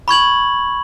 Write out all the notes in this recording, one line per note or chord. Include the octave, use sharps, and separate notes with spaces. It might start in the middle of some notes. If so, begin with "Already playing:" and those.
B5 C#6 G#6 F#7